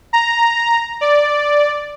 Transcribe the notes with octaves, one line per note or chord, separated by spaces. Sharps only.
A#5
D5